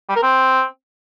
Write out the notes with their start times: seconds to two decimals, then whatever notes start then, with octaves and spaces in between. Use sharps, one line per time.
0.09 G3
0.16 A#4
0.23 C4